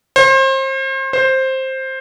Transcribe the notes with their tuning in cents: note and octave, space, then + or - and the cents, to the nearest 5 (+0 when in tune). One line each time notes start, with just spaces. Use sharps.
C5 +35
C5 +10